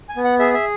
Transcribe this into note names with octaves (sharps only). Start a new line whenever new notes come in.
G#5
B3
F#5
G#4 E5
E5